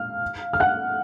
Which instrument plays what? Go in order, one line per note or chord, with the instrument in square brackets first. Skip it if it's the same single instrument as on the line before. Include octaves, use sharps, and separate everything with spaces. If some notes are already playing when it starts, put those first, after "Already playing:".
Already playing: [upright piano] F5 F6
F6
F#5 F#6